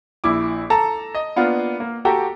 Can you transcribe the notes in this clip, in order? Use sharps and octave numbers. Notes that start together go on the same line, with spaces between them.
A#1 E4 D6
A4 A5 A#5
D#5
A#3 B3 D4 F4
A#3
F#4 G4 A4 G5 A#5